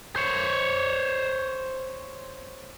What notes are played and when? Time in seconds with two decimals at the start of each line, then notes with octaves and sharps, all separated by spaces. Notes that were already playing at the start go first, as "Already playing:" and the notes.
0.16 C5 C#5